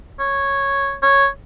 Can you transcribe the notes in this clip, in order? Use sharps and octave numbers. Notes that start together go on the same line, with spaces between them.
C#5
C#5